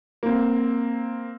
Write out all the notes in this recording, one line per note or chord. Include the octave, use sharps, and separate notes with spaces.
A#3 C4